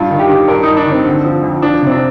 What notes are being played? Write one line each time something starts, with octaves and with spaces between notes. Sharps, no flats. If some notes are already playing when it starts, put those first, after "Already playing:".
Already playing: G2 F4
D#3
G4
D#3
G2 A#4
G2 D#4
D4
D#3
C4
D3
F3
F2
F3 D4
C3 C4
D4